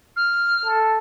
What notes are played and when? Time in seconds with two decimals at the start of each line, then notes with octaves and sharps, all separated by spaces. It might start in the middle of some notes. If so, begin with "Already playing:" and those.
0.16 F6
0.65 A4